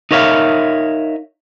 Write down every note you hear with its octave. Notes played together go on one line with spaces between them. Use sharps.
D#4 A#4 C#5 E5 F5